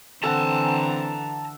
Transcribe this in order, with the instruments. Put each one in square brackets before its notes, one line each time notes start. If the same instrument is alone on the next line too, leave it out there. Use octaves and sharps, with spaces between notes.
[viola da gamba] D3 E3 [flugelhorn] C4 [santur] A4 F#5 [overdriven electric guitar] A5 A#5